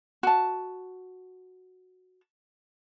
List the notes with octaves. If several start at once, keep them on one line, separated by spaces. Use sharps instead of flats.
F#4 A5